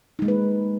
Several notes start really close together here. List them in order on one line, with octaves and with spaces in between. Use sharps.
D#4 G#3 A#3 B4